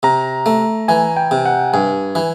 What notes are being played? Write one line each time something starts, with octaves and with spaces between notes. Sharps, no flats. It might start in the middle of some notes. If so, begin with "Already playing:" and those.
C3 A#5
A3
E3 G#5
G5
C3
F#5
G2 G#5
E3